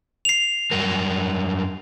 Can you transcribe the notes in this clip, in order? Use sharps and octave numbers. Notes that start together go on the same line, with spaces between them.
C7 F7
F#2 G3 A#4